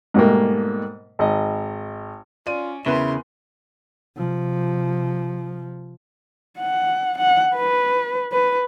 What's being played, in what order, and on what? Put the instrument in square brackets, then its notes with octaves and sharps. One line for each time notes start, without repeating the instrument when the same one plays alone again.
[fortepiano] G#2 B2 G3 A3 A#3
G#1 D#5
[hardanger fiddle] C#4 [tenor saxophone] F4 [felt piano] D5 D#7
[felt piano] E2 B4 [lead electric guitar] C#3 [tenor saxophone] E4 [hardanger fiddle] A#4 C6
[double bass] C3 F3
[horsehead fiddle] F#5
F#5
B4
B4